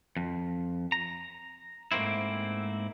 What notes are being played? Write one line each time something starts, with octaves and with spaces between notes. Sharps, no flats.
F2
A#5
G#2 A3 A#3 C4 E4